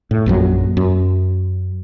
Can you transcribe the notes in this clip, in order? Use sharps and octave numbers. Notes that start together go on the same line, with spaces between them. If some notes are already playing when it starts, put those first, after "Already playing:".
A2
A#1 F#2 F3 F#3
F#2